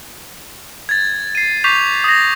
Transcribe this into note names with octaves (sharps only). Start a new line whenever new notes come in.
G#6 A6
C7 D#7
C#6 D6 G6 B6 C7 F7
D#6 A#6